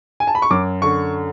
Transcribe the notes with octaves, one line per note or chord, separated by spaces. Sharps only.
G#5
A5
B5
C#6
F#2 D6
D3 C#6